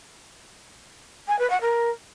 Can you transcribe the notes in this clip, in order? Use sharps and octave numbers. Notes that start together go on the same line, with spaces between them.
G#5
B4
F#5
A#4